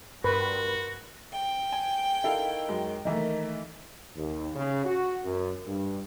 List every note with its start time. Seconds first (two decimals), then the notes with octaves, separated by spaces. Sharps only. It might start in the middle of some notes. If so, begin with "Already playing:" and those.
0.24 G2 F#4 A#4 B4 B5 C6
1.32 G5
1.72 G#5
2.24 D#3 E4 A4 F5
2.68 F#2 G#3
3.05 D#3 E3 A3 A#3 D#4
4.16 D#2
4.55 C#3
4.84 F#4
5.23 F#2
5.66 G2